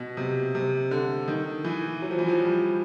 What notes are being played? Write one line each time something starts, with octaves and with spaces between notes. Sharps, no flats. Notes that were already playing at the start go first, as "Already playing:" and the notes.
Already playing: B2
C3
C3
D3
D#3
E3
F#3
F3
E3
F3
G3